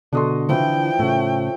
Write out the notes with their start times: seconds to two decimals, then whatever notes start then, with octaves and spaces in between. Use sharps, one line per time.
0.13 B2 D3 D4 F#4 A4 D#5 C6
0.49 E3 F3 E4 G5
0.99 A2 C#3 A3 C#5